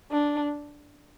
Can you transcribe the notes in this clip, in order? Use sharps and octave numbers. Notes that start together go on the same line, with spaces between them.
D4